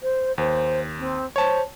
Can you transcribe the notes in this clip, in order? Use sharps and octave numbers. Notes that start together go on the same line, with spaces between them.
C5
D#2 C5
C4
C5 C#5 A5